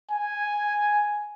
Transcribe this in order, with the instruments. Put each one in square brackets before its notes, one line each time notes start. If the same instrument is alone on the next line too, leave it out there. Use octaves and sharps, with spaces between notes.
[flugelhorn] G#5